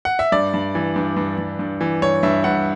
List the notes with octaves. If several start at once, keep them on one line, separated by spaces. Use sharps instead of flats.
F#5
E5
G2 D5
G2
E3
G2
G2
G2
G2
E3
G2 C#5
G2 E5
G2 F#5